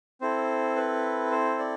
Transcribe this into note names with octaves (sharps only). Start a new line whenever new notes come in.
C4 E4 A4 C5
B4
C5
D5